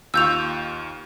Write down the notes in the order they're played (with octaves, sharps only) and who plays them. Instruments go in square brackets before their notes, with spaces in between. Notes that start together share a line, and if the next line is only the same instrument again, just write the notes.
[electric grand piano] D#2 F4 C#6 [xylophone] E6 G6 F7